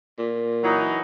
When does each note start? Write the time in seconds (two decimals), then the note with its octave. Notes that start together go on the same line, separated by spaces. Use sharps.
0.19 A#2
0.64 E3 F#3 D#4